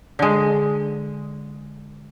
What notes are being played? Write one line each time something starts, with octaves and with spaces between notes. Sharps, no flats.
D3 G#3